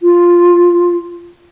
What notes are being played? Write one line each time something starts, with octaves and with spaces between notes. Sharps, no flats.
F4